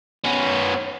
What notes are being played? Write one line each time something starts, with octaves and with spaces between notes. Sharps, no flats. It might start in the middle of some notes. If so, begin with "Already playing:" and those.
B3 C#4